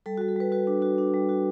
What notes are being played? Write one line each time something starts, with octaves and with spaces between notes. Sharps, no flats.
G3 A4
G3 F#4
A4
G3 B4
F#4 B4
D4
F#4
D4
G3
F#4